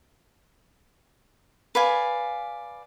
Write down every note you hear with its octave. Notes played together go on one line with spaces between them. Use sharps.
B4 D5 F5 G#5